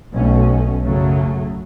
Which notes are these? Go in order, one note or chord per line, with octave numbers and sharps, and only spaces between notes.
B1 B2 A3 C#4
F#2 C#3 F#3 A3 C#4